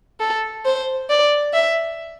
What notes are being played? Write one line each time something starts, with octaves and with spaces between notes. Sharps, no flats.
A4
C5
D5
E5